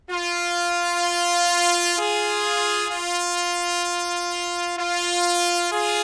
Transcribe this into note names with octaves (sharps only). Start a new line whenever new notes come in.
F4
F4 G#4
F4
F4
F4 G#4